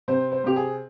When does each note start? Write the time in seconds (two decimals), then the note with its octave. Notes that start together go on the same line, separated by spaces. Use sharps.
0.08 C3 C5
0.32 C5
0.44 C3 G4
0.56 G#4